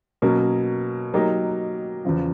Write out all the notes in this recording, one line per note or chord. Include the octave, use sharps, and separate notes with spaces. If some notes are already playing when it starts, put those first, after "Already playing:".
B2 F#3 A#3 C#4
F#3 A#3 D#4 G4 A#4
E2 C#3 F3